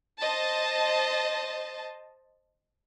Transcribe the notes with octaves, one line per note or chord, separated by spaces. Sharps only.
C5 D#5 A5